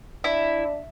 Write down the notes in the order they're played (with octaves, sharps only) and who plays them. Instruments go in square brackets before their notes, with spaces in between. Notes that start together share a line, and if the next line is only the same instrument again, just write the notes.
[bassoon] D4 [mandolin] E4